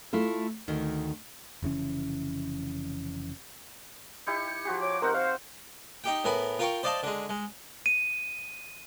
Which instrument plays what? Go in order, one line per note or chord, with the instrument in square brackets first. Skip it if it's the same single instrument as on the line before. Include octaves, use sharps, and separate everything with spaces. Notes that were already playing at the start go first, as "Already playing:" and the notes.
[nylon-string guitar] A3 E4 F4 A4
D2 D#3
[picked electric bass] F1 C#3 E3 C#4
[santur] D#4 E4 G4 [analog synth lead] C#7
[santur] F3 F#4 G4
[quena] C#5 [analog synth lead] D6
[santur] C4 D#4 F#5 [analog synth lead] A#4 [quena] C5
[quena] C5 [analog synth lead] F5
[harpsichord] D#4 G4 G5
A2 B3 A#4 G#5
F4 A#4 F5 G5 C#6
C5 D5 D#5 F5 A5
D3 G#3
G#3
[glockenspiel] D#7